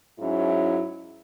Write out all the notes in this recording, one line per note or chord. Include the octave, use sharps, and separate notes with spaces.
G#2 F#3 C#4 E4